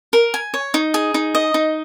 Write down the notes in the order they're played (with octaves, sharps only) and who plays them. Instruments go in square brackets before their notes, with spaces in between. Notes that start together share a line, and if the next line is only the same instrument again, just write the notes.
[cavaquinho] A#4
G#5
C#5
D#4
G#4
D#4
D#5
D#4